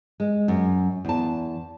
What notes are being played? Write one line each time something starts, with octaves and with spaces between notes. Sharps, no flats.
G#3
F#2
E2 A5